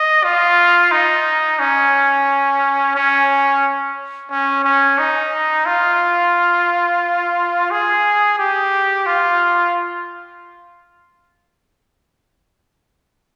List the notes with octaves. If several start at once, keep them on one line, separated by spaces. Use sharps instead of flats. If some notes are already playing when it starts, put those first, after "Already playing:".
Already playing: D#5
F4
D#4
C#4
C#4
C#4
C#4
D#4
F4
G#4
G4
F4